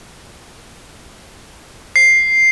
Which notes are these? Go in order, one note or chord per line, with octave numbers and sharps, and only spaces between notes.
C7